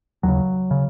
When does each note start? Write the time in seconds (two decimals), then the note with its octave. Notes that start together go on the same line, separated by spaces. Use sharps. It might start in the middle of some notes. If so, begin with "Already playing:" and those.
0.23 D#2 C#3 F#3
0.71 C#3